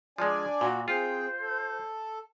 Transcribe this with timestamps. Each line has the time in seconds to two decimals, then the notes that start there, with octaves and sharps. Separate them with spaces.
0.18 F3 G#3 D4 D5 G#5
0.61 A#2 F#4
0.88 C4 F4 G#4 C5 G5
1.40 A4